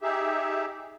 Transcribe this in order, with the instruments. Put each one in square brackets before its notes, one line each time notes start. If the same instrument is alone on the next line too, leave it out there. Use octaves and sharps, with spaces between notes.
[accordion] D#4 G4 G#4 E5